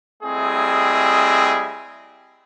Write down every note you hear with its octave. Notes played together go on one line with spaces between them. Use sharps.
G3 A3 C4 E4 G#4 D#5